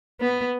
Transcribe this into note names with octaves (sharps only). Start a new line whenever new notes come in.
B3